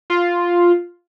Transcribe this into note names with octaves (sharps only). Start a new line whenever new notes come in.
F4